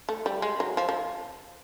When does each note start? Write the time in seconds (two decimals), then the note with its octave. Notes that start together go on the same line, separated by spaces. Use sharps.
0.09 A3
0.26 G3
0.42 G#3
0.60 F#3
0.77 F3
0.89 F3